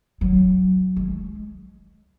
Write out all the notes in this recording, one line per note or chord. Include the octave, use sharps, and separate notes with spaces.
F#3
G#3